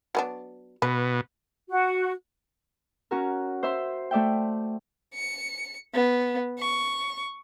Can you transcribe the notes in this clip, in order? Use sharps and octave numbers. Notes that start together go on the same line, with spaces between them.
F#3 B3 D4
B2 B4
F#4
C#4 F#4 A#4
C5 E5 C6
A3 D5 E5 G5
C#7
B3
C#6